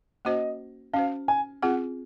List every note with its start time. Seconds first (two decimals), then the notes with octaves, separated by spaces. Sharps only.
0.25 A#3 C#4 F#4 C5 D#5
0.94 C#4 F#4 C5 F5
1.28 G#5
1.63 C4 F4 G#4 F#5